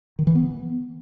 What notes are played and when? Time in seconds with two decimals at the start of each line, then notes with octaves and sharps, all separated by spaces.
0.19 D#3
0.27 E3
0.35 B3